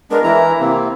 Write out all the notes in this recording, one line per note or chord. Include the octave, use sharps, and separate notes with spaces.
G#3 B3 D4 A#4
E3 E4 A#5
C3 A#3 C4